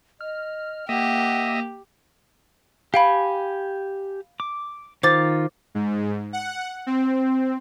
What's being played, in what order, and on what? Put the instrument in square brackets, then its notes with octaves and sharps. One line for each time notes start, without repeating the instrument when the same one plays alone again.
[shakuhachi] D#5 [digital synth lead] F6
[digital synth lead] A#3 [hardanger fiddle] G4 [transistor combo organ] D#5 E5 [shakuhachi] F#5
[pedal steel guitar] G4 G#5 [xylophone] F5 G5 B5
[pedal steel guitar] D6
[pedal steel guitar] D#3 F4 [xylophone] C5 D6 A6
[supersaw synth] G#2
F#5
C4